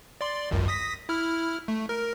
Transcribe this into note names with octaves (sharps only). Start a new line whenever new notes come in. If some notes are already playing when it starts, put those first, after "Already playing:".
D5 C6
G#1 C#2 F#2
D#6 A#6 B6
E4 F6
A3
A#4